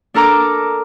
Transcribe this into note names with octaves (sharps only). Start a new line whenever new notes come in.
D4 A4 A#4 A#5 D6